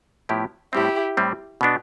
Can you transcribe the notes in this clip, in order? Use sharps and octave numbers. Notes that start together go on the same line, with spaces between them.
A2 F3 B3 E4 G4
A2 G3 C4 E4 G4
A2 G3 C4
B2 B3 D4